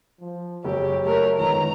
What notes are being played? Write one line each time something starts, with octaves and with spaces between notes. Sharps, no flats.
F3
F#1 G4 C#5
A3 A#4
G1 D#3 G#3 A#5